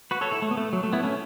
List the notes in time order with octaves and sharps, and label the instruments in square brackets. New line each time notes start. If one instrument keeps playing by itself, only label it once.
[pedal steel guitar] F#4 B4
A4 C#5
E4 A4
A3
B3
A3
F#3
A3
B3 E4
A3 C#4